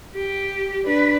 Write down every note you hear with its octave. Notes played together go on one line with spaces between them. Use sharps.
G4
D4 B4